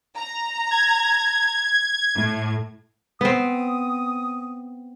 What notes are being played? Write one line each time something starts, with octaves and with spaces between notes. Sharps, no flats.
A#5
G#6
A2
B3 C4 D#6